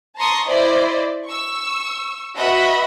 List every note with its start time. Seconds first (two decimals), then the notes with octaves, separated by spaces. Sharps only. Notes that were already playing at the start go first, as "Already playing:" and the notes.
0.16 A5 A#5 C6 C#6 D#6
0.46 E4 C5 D5 D#5
1.25 C#6 E6
2.36 F#4 B4 D#5 E5 F#5 B5